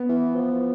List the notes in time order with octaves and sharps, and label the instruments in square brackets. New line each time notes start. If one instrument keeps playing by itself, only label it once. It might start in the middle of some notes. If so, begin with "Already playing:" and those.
Already playing: [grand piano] B3
[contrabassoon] E3
F3